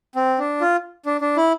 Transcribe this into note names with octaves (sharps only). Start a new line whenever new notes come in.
C4
D4
F4
D4
D4
E4